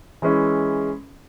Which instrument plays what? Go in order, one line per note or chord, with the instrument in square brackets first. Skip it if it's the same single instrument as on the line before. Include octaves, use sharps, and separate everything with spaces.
[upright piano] E3 G#3 C#4 E4